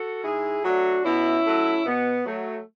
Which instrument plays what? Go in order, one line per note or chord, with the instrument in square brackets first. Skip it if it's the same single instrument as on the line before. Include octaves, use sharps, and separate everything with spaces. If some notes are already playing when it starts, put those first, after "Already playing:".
Already playing: [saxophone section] F#4 A4
G#2 E4 G#4
F#3 A3 D4 F#4
B2 C#4 E4
F#3 A3
B2 B3
F#3 A3